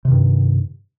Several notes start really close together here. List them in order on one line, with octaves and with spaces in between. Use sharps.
C3 D#3 G2